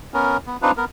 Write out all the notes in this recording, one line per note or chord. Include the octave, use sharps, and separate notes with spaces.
B3 C#4 A#4
B3
C4 D4 D#4 F4 B4
B3 A#4